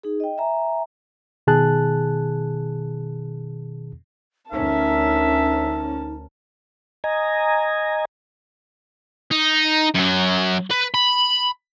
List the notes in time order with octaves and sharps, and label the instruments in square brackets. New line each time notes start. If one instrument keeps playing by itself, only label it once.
[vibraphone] D#4 G#4
D#5 G5
E5 G#5 A#5
[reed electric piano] B2 D#3 G#4 A5 F#6
[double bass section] D2 C#4 [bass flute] D#4 [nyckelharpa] A#4 A5 [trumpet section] E5
[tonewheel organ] D#5 G#5 A#5
[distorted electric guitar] D#4
F#2 F#3
B4
B5